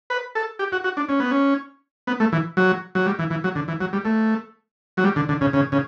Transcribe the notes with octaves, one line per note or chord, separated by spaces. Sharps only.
B4
A4
G4
F#4
F#4
D4
C#4
B3
C#4
B3
A3
E3
F#3
F#3
G3
E3
E3
F#3
D3
E3
F#3
G3
A3
F#3
G3
D3
D3
C#3
C#3
C#3